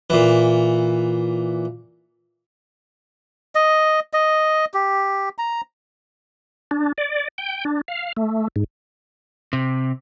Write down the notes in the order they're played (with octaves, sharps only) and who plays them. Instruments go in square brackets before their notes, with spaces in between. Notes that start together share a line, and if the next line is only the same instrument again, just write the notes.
[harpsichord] A#2 E3
[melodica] D#5
D#5
G4
A#5
[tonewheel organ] D4
D5
G5
D4
F5
A3
G#2
[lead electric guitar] C3